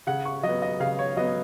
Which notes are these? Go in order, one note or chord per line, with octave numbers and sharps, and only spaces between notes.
C#3 F#5
C#6
F#3 B3 D#5
D#5
C#3 F5
C#5
F#3 B3 D#5